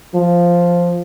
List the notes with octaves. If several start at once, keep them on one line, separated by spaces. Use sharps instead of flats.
F3